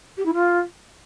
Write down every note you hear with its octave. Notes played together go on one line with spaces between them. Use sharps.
G4
E4
F4